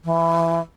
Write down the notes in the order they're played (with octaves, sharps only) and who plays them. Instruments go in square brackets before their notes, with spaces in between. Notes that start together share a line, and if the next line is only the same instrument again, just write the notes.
[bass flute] E3